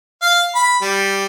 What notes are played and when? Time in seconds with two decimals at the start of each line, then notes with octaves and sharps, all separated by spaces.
0.22 F5
0.55 B5
0.82 G3